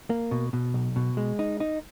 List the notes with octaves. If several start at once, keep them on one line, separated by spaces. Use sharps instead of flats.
A#3
B2
B2
B1
B2
G#3
D#4
D#4